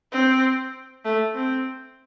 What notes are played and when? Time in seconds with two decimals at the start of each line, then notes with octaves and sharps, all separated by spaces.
0.12 C4
1.05 A3
1.35 C4